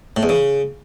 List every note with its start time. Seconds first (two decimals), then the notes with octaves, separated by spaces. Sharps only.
0.17 A2
0.23 E2
0.29 C#3